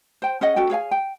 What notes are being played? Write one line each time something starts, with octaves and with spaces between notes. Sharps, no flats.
C5 G5
C#4 G#4 D#5 F#5
C#4 F#4 A4 G5
G#4 C#5 F5 G#5
G5